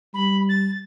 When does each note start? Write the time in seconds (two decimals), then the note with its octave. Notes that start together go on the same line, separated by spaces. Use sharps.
0.14 G3 B5
0.49 A6